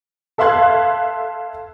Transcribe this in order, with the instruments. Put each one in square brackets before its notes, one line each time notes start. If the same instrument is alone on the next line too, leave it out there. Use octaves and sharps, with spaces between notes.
[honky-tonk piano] A4 E5 F5 C6 F#6 G#6